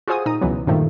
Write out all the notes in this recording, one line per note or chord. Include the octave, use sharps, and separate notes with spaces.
F4 F#4 G#4 C5 G#5 D#6
A#2 D#4 A#5 D#6
C#2 B2 E3 F#3
G2 A#2 D#3 F3 A3